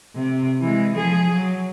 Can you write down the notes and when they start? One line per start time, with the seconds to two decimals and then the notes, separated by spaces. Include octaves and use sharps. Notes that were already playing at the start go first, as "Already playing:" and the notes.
0.15 C3
0.61 E3 G#3
0.96 F3 G#4
1.32 F#3